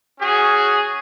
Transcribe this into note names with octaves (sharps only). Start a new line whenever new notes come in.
C#4 F#4 G#4